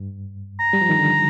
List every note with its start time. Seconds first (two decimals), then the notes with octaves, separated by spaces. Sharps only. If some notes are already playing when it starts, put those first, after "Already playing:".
Already playing: G2
0.59 A#5
0.73 G3
0.81 F3
0.90 D#3
0.99 D3